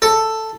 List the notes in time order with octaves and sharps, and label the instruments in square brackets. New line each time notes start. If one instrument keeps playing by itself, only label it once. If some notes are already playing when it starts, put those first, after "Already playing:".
[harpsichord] A4